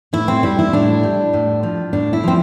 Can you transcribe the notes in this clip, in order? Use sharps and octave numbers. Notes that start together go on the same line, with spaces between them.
A2 E4
C4
G3 E4
E4
A2 D4
G3
A2
F3
A2 D4
E4
F3 C4